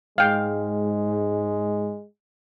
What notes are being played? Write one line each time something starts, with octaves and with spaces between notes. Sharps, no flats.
G#2 G#3 F5 G5